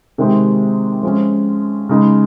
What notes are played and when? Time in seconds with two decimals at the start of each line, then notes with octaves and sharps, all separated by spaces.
0.18 C3 D#3 G#3 C4 G4
1.03 F3 G#3 C#4
1.89 C#3 G#3 D#4